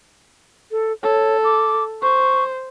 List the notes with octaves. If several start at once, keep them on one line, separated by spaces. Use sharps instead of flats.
A4
A4 C#5
D6
C5 C#6